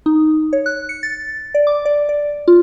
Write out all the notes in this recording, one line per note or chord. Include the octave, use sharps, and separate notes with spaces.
D#4
C#5
F#6
C#7
A6
D5
D6
D5
D5
F4